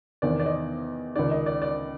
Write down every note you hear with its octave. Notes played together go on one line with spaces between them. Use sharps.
E2 C3 D#3 D5
D5
D#5
C#2 C3 D#3 D5
D#5
D5
D5